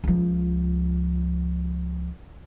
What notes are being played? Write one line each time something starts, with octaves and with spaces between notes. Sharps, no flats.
C#2 F3